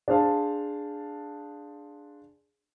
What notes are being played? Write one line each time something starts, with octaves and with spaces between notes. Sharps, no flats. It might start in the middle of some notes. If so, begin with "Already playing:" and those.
D4 G#4 C5 F5 A5